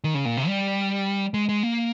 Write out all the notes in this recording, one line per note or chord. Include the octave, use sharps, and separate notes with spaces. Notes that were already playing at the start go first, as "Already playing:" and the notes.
D#3
C#3
A#2
C3
G3
G#3
G#3
A#3